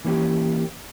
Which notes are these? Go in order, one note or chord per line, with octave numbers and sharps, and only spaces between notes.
E3 A#3 C#4 G4